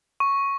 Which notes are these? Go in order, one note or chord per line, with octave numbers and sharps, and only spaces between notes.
C#6